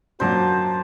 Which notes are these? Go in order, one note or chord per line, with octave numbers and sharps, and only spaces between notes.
F#2 A#2 D4 F#4 C5 A5